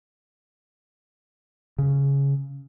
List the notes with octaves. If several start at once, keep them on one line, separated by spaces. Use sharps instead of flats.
C#3